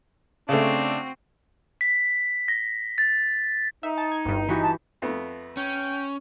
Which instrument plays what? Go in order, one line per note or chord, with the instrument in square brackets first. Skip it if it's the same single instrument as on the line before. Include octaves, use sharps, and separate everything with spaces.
[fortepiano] C#3 A3 [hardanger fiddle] C4 F#4 [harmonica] D4
[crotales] B6
A#6
A6
[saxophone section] D#4 [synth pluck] E5
[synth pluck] A5
G#6
G1 G2
[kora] E3 F#4 G4
[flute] A5
[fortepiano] F2 A3 B3
[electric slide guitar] C#4 [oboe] G5